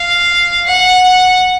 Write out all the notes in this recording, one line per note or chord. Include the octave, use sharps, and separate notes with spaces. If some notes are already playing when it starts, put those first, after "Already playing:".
Already playing: F5
F#5